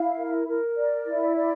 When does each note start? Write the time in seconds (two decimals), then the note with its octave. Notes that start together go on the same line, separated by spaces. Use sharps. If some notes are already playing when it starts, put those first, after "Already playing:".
Already playing: E4 F5
0.17 A#4
0.48 A#4
0.76 D5
1.06 E4
1.36 D5